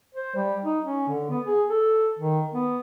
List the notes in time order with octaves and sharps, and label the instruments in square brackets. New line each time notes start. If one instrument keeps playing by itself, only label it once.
[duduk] C5
G3
D#4
C#4
D3
B3
G#4
A4
D#3
B3